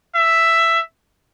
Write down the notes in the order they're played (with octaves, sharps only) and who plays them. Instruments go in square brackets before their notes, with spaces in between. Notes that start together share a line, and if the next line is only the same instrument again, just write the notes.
[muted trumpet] E5